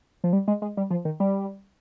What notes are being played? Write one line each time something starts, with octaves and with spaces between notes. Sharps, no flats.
F3
G3
G#3
G#3
G3
F3
D#3
G3